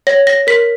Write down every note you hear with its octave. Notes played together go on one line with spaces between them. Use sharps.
C#5 A#6
A#6
A#4 B6